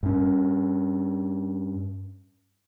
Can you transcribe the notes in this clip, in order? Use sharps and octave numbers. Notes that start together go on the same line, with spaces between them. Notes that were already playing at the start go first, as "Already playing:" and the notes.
G2 C#4